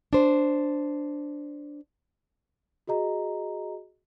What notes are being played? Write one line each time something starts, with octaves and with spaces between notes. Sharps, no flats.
D4 C5
F#4 G#4 D#5 A#5